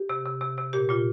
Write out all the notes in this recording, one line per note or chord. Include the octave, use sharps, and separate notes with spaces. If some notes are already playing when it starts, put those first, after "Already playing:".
Already playing: G4
C3
C3
C3
C3
A#2 G4
A#2 F4